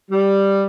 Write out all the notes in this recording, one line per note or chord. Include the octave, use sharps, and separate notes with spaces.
G3